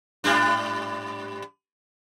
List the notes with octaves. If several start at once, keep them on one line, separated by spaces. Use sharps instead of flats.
G#2 G3 D4